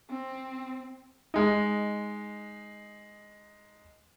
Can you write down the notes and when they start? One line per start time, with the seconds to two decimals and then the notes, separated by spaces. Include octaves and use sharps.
0.10 C4
1.34 G#3 D#4